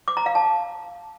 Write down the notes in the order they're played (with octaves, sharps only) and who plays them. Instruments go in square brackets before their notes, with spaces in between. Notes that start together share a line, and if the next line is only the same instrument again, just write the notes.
[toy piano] D6
A#5
F5
A5